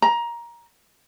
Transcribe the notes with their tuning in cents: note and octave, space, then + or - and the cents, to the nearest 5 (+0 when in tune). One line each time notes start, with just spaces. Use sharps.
A#5 +15